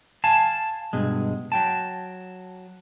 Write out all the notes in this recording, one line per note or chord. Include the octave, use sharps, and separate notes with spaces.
F5 G#5 A5
G2 B2 G#3
F#3 G5 A5